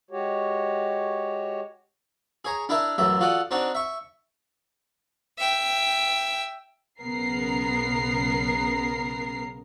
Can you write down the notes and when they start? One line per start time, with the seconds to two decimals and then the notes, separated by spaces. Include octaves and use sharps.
0.11 G#3 F#4 G4 C#5
2.45 G#4 C#5 A#5
2.69 D4 E4 A#4 E5 A5
2.98 A1 F#2 F#3 E5
3.21 F4 F#4 A4 D5 F#5 D#6
3.51 C4 D4 D#4 F#4
3.75 E5 C#6
5.38 E5 G5
7.02 B1 C#3 B3 A#4 C7